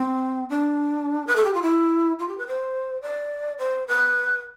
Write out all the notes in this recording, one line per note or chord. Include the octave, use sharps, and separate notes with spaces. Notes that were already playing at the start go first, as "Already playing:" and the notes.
Already playing: C4
D4
B4
A4
G4
F4
E4
F4
G4
B4
C5
D5
C5
B4